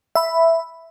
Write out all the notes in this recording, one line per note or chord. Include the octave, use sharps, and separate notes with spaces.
E5 B5